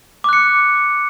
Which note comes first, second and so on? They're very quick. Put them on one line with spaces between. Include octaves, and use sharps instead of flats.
D6 F#6 C#7